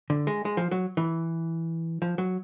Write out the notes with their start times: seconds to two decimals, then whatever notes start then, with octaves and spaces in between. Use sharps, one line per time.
0.10 D3
0.27 G#3
0.45 G#3
0.57 F3
0.71 F#3
0.97 E3
2.02 F3
2.18 F#3